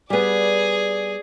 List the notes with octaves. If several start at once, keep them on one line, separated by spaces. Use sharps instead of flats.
G3 B3 G#4 D5